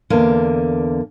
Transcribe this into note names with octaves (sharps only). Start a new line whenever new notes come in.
E2 D3 A#3